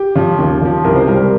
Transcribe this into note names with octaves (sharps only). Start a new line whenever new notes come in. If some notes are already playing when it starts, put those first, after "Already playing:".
Already playing: G4
C#3 F3
D#2
C#3 F3
C2 A#4
C5
C3 G3 A#4